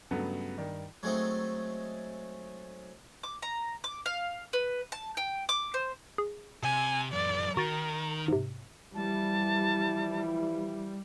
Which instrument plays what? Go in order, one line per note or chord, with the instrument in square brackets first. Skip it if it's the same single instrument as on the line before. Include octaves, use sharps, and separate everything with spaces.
[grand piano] G2 C#3 F#3 A3 B3
G2 D#3 D5
[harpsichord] F#3 G#3 A3 C4 D#4
[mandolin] D6
A#5
D6
F5
B4
A5
G5
D6
C5
[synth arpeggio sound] G#4
[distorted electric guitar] C3 [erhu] G#5
[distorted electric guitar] F#2 E3 [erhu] D5
[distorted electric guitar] D#3 [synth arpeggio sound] F#4 A6 [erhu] A#4
[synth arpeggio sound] G#2 C3
[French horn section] E3 F3 E4 [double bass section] G3 [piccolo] A5